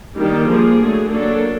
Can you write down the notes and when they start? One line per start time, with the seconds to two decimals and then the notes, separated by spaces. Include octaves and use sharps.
0.17 D#3 G3 A#3 D4 G4
0.48 F3 A#3 D4 G#4
0.80 D3 F#3 A3
1.11 F#3 A#3 D4 A4